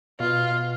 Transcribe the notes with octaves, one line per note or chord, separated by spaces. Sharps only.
B2 F4